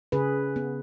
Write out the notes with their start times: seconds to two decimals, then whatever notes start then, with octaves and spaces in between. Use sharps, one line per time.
0.12 C#3 G#4 B4
0.56 B3